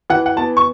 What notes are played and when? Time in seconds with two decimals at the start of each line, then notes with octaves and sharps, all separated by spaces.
0.10 E3 F#5
0.26 F#5
0.37 B3 A5
0.57 C#6